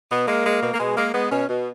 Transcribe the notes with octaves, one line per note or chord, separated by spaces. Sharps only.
B2 B3
G#3 A#3
G#3
B2
A#3
B2 G#3
G#3 A#3
G#3 B3
B2 C#4
B2